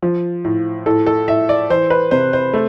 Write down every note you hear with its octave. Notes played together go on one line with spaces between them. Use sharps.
F3
A2
A2 A4
A4
A2 E5
D5
E3 C5
B4
C3 C5
C5
A3